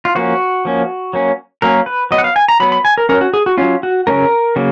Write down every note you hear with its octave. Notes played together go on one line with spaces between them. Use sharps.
F4
F3 A#3 C#4 F#4
F3 A#3 C#4
F#3 A#3 C#4
F#3 A#3 C#4 A#4
B4
F#3 B3 D#5
F#5
F5
G#5
A#5
F#3 B3 B5
B5
G#5
A#4
F#3 C#4 A#4
F#4
G#4
F#4
F#3 C#4 F4
F#4
C#3 F#3 A#3 C#4 A#4
C#3 F#3 A#3